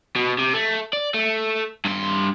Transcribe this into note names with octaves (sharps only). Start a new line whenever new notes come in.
B2
C3
A3
D5
A3
G2 C6